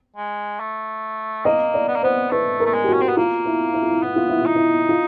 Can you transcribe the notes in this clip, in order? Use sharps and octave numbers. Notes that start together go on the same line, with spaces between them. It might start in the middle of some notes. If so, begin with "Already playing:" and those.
G#3
A3
A#3 D#5
D5
B3
A#3
B3 C5
A3 B4
A#4
A3
G#3
G4
C#4 F#4
C4
B3
A#3 F4
E4
E4
F4
E4
B3 E4
F4
E4
F4
D#4
E4
F4